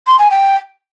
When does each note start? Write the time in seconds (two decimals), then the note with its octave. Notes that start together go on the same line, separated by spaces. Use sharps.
0.07 C6
0.19 G#5
0.30 G5